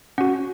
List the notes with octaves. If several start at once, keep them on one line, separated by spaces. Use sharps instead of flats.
C#4 F#4 F#5